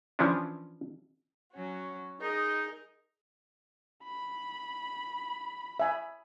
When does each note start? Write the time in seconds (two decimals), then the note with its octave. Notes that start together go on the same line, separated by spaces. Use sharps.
0.19 E3 F3 C#4 D4
1.53 F#3 C#4 F#4
2.21 D#4 G#4 A#4 D#5
4.04 B5
5.80 E5 G#5